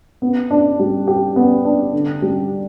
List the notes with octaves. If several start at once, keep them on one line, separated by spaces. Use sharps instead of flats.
B3
D4
G3
G4
B3
D4
D3
G3